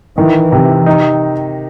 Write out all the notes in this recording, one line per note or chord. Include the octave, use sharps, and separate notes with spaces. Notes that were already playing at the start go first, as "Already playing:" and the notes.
D#3 E3
C3
D#4